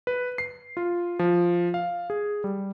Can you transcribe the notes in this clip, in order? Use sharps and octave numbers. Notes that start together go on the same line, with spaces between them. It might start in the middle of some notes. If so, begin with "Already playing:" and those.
B4
C7
F4
F3
F5
G#4
G3